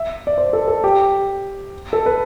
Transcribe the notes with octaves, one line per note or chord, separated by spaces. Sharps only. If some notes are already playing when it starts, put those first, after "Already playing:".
Already playing: E5
D5
C5
A4
A4
G4
A4
B4